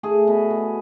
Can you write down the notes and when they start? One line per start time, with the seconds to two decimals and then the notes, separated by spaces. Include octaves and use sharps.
0.03 A3 G#4
0.27 B2
0.50 B2